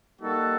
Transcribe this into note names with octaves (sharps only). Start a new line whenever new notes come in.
G3 A#3 D#4 F#4 A4